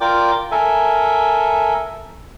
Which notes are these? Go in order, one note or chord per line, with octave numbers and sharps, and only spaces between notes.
F4 A#4 D5 G5 D6
A4 A#4 E5 G#5